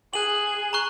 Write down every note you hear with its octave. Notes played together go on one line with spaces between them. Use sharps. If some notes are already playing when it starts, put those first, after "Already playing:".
G#4 F#6 D#7 F#7
A#5 C#6 F#6